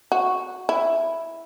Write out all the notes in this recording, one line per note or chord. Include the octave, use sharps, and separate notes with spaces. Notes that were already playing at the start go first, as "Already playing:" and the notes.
F#4
E4